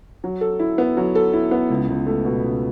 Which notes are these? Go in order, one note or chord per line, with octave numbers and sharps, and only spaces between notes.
F#3
A4
E4
B3
F#3
A4
E4
B3
C#2
C#2
A3
B2
C#2